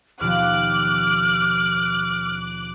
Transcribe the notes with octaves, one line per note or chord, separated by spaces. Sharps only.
D#2 B2 F3 D6 F6 F#6